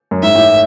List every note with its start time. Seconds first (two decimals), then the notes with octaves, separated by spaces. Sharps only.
0.11 F#2
0.23 G#2 E5
0.35 A1 A2